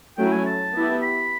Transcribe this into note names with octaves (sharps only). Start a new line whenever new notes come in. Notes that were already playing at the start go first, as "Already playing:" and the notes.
F#3 A3 C#4 E4 G5
G#5
A5
B3 E4 G4
B5